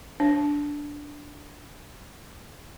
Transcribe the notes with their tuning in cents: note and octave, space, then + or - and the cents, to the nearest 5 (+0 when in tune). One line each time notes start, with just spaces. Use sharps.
D4 -5